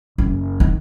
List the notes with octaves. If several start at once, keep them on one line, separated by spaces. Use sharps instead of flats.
F#1
D#3